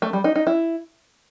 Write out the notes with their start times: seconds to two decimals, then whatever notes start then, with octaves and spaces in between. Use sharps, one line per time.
0.02 A3
0.13 G3
0.24 D#4
0.35 D#4
0.47 E4